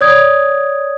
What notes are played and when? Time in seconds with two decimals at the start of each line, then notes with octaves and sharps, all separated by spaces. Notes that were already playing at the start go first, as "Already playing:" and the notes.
0.01 C#5 D5 D#6 G#6